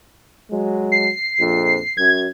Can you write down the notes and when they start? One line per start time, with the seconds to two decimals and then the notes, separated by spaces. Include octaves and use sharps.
0.51 F#3 G#3
0.92 C7
1.39 A#1 F2
1.97 F#2 G#6